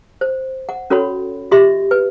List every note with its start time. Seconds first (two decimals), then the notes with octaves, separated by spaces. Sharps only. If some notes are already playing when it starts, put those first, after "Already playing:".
0.21 C5
0.69 F#5
0.90 C#4 F#4 A4 C#5 B5
1.51 F4 G4 D#5 E5 C6
1.91 B4